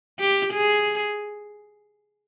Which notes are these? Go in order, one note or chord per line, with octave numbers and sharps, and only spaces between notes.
G4
G#4